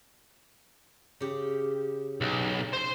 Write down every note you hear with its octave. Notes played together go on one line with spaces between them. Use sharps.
C#3 G4
B1
C5 C6